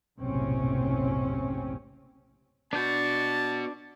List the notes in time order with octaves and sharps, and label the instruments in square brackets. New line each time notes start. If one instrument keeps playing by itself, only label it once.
[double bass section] F#1 B1 A2 C3 C4 C#4
[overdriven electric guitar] B3 F#4 [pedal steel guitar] D4 G6 [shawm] A5